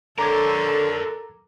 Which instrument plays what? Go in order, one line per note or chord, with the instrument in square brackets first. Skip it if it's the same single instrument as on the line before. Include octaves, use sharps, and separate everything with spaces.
[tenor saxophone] D3 [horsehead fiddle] A4 [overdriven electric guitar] A#4 C#5 [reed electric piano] A#5 D6 G#6